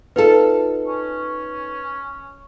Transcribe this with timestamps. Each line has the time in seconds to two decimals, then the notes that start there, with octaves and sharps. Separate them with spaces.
0.16 D#4 F4 A4 B4
0.86 C#4